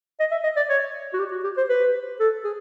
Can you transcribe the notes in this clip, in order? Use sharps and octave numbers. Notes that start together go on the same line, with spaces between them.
D#5
E5
D#5
D5
C#5
F#4
G4
F#4
G4
C5
B4
A4
G#4